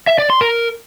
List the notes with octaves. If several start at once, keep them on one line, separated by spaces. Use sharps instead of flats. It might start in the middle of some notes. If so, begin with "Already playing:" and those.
E5
D5
C6
A#4